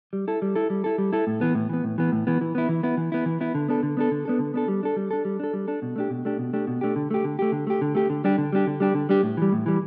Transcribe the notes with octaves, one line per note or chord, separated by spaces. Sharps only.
G3
E4 A4
G3
E4 A4
G3
E4 A4
G3
E4 A4
A2
E3 B3
A2
E3 B3
A2
E3 B3
A2
E3 B3
E3
B3 E4
E3
B3 E4
E3
B3 E4
E3
B3 E4
D3
B3 D4 A4
D3
B3 D4 A4
D3
B3 D4 A4
D3
B3 D4 A4
G3
D4 A4
G3
D4 A4
G3
D4 A4
G3
D4 A4
B2
A3 D4 G4
B2
A3 D4 G4
B2
A3 D4 G4
B2
A3 D4 G4
D3
A3 G4
D3
A3 G4
D3
A3 G4
D3
A3 G4
D3
G3 D4 G4
D3
G3 D4 G4
D3
G3 D4 G4
D3
G3 D4 G4
A2
E3 G3
A2
E3 G3